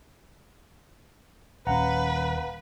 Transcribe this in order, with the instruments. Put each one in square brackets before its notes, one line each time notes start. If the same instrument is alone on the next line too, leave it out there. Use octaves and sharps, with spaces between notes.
[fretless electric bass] D#1 C#4 [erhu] B4 [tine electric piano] F5 F#5 A#5